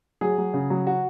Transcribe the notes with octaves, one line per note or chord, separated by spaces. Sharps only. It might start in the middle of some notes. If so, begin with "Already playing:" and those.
F#3 G#4
F#3
C#3
F#3
F#4